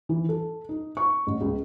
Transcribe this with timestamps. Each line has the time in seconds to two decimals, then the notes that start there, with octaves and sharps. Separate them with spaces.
0.09 E3
0.29 A4
0.69 D#4
0.97 C#6
1.27 A1
1.41 C#2